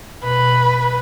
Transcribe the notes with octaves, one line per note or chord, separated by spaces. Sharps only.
B2 B4